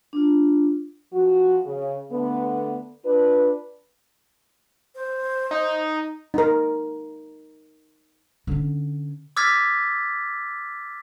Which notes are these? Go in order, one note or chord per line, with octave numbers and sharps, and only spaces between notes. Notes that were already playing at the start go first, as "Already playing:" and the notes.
D4 F4
F3 F#4
C#3
D3 A3 B3
D4 F4 B4
C5
D#4
D#4 A#4
D3 C#4
D6 E6 F6 G#6 A6 B6